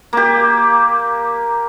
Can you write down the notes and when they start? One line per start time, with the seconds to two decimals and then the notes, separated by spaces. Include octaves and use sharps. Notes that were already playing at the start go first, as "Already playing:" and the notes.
0.13 A#3 G4